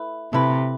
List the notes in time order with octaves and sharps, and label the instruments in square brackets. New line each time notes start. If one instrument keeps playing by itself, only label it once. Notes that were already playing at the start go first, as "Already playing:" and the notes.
Already playing: [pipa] A3 E4 B4
[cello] C3 [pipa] A3 E4 B4